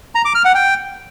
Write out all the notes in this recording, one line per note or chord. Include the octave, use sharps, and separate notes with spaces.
A#5
D6
F6
F#5
G5